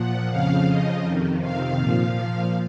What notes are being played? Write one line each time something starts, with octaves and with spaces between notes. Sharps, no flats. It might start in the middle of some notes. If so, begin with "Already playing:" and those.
Already playing: A#2 F3 F#5
F2 C#3 F3 F5
D#5
F2 C3 D#3
F5
A#2 F3